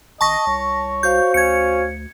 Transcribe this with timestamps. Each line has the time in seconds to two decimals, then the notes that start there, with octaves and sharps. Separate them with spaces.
0.21 G#1 D#5 A5 C#6 A#6
0.47 C2 C#5
1.03 F#4 C5 F5 G6
1.34 D2 C#4 G#6 C#7